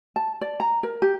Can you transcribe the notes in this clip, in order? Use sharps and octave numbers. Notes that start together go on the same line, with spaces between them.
A5
D5
A#5
A#4
G4